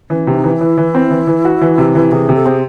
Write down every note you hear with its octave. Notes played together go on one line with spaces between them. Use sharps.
E3 C#4
C3
D#4
E3
E4
E3
E3
C4
E3
E3
F#4
E3
C3
E3
C3 G#4
C3
A4
C4 G#4